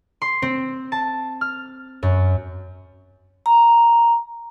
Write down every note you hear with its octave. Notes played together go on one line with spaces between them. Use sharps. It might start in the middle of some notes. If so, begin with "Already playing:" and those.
C6
C4
A5
F6
F#2
A#5